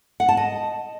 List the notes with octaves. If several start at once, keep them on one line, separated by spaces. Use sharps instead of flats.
F#5
A5
D#5